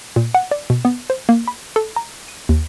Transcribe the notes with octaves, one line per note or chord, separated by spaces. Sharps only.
A#2
F#5
D5
B2
B3
C5
A#3
B5
A4
A#5
D#7
D#2